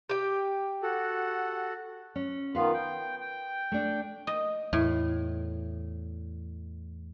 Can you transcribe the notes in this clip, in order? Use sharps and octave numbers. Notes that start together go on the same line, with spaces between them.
G4 G5
F#4 A4 F#5
C#4
D#3 B3 F4 B4 F5
G5
G5
A3 D4
D#5
E2 A2